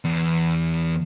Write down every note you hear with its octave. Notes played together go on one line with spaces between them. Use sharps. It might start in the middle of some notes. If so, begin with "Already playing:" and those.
E2